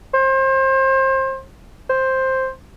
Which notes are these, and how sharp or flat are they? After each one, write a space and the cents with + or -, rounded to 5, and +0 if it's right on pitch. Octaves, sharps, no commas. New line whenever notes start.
C5 +30
C5 +5